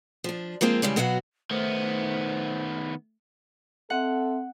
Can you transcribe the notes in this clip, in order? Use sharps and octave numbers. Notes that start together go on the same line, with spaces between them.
F3 D4
F3 G#3 A#3 C4 F4
C#3 E3 G3 G#3
B2 F#3 B3 F#4 E5 F5
D#3 A3 B3 C5
C4 A4 E5 F#5